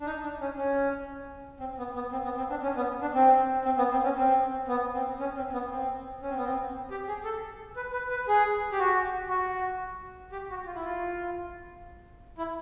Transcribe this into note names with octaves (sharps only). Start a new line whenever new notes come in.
D4
D#4
D4
C#4
C#4
C4
B3
B3
C4
B3
C4
D4
C#4
B3
D4
C4
C4
B3
C4
C#4
C4
B3
C4
C#4
C4
B3
C4
C#4
C4
B3
C4
G4
G#4
A4
B4
B4
B4
G#4
G4
F#4
F#4
G4
F#4
F4
E4
F4
E4